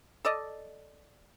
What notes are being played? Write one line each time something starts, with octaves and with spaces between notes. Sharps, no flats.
A4 D5 D#5